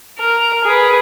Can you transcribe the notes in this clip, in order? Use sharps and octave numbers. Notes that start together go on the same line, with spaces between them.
A#4
G#4 B4